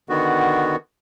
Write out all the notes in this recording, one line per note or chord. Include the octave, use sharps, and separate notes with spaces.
D3 D#3 B3 F#4